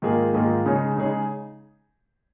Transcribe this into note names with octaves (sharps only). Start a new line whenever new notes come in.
G#2 D#3 A#3 F4 G#4
G#2 D#3 A#3 F4 G#4
C#3 G#3 D#4 G#4 C#5
C#3 G#3 D#4 G#4 C#5